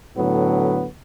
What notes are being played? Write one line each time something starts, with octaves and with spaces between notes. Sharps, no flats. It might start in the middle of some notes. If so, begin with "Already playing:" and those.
A2 D3 F#3 B3